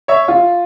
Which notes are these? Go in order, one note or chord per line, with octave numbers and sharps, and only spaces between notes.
C#5 E5
F4